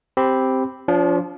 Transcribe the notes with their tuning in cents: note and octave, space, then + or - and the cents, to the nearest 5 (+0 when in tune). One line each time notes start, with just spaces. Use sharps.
C4 +0 G4 +0 B5 +0
F3 +5 D4 -40